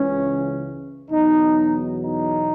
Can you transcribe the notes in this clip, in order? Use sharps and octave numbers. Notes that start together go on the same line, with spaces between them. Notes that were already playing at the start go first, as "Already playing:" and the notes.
Already playing: C#2 C#3 E3 C#4
E2 B2 F#3 D#4
D#4